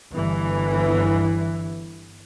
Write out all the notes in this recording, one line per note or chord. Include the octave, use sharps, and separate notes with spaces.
G1 E3